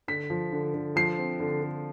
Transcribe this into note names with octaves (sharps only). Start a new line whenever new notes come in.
D3 B6
F3
D3
D3
F3 C7
C4
D3
D3